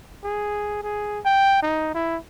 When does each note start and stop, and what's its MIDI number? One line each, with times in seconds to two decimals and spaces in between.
0.23 0.82 68
0.83 1.20 68
1.25 1.57 79
1.62 1.91 63
1.94 2.17 64